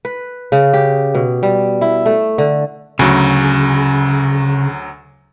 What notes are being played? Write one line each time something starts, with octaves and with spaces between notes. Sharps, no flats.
B4
C#3
G4
B2
G3
E4
A3
D3
D2 C#3 F#3